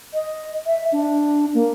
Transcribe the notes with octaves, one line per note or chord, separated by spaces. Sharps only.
D#5
E5
D4
A#3